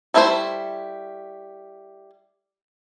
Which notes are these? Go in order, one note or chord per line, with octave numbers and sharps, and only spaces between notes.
G3 A3 E4 F#4 C5